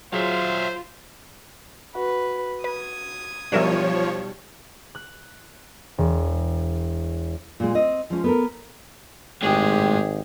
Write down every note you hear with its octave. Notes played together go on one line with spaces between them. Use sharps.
F#3 F4 G#4 C5 C#5 E5 F5
F#4 B4
B4 D#6 G#6
B1 F3 G3 D4 A#4 C#5 E5 E7
F#6
E1
A#2 G#3
C4 D#5
F3 G#3 C#4
B3 A4 A#4
G#1 A2 G#3 G4 G#4